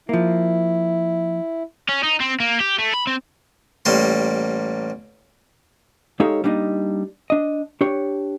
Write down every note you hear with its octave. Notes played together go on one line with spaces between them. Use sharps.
F3 A#3 E4
C#4
D#4
C4
A#3
G4
A3
B5
C4
A1 G3 A#3 C6
G#3 D#4 G4 A4 C#5 F5
G3 A#3 D4 D#4 D#5
D4 D#5
D4 G4 C#5